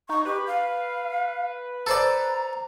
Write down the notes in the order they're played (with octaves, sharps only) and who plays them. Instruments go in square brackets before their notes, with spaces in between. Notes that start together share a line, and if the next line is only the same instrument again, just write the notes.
[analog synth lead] D#4 [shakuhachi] C#6
[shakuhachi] G4 [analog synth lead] B4
[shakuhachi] F5
[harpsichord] A4 C5 D5 [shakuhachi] A#5